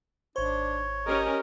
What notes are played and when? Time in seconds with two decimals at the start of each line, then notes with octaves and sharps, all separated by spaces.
0.36 G#1 D4 C5 C#5
1.06 C#4 G4 A#4 D#5